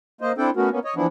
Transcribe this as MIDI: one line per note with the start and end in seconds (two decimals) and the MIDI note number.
0.21 0.32 58
0.21 0.32 72
0.21 0.32 75
0.38 0.50 60
0.38 0.50 62
0.38 0.50 64
0.38 0.50 69
0.38 0.50 79
0.56 0.69 57
0.56 0.69 59
0.56 0.69 61
0.56 0.69 66
0.56 0.69 70
0.71 0.79 58
0.71 0.79 59
0.71 0.79 61
0.84 0.94 73
0.84 0.94 75
0.96 1.06 52
0.96 1.06 53
0.96 1.06 59
0.96 1.06 62
0.96 1.06 64